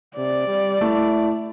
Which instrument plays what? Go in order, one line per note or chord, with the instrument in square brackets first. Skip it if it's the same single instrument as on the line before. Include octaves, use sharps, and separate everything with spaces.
[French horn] C3 [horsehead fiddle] D5
[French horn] G3
[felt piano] A3 [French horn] E4